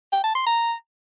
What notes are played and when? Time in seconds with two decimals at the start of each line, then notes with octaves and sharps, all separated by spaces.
0.12 G5
0.24 A5
0.35 C6
0.46 A#5